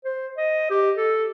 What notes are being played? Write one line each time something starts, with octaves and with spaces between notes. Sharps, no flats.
C5
D#5
G4
A4